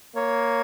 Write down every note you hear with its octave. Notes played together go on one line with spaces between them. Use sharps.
A#3 C#5